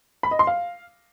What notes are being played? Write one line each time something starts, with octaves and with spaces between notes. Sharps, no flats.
B5
D#5
C6
F5